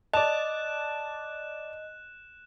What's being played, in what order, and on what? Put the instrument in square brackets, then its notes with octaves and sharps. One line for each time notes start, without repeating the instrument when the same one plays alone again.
[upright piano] D5 A5 [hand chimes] D#5 [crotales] F#6 E7